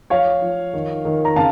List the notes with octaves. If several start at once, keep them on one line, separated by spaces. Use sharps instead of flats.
F3 C#5 F5
F3
D#3
D#3
A#5
C#3 F5 A5